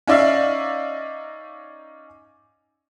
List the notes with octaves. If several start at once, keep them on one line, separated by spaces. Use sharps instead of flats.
C#4 D#4 D5 E5 F5